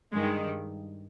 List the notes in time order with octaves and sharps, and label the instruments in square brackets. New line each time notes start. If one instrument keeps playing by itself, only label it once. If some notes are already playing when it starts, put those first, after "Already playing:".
[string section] G2 D#3 G#3